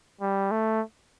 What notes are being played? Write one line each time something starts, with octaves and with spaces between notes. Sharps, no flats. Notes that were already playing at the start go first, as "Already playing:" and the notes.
G3
A3